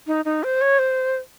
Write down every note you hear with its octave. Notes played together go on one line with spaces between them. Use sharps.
D#4
D#4
C5
C#5
C5